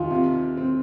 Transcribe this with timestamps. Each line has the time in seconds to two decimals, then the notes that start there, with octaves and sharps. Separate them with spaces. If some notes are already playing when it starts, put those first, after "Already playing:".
Already playing: D#2 F4
0.11 C3
0.57 C4